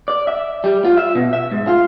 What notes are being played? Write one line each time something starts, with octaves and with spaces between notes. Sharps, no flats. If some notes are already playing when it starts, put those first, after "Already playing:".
D5
E5
G3
F4
E5
B2
E5
G#2
F4